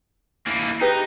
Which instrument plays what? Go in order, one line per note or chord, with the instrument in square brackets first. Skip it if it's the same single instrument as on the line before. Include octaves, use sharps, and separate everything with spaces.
[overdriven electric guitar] E3 A#3
[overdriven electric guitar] D#4 [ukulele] G4 G#4 B4